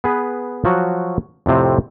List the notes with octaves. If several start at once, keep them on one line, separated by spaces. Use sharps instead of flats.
B3 G#4 B4
F3 F#3 F#4
F2 A2 C3 C4